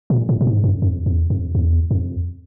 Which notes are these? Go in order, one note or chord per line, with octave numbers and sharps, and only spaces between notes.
A#2
A2
A2
G#2
F#2
F2
E2
F2
E2
F2